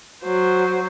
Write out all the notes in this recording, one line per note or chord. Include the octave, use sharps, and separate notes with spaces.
F#3 C5